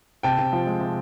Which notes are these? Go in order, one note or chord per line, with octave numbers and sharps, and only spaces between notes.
C3 G5 A5
C3
F3
G#3
C3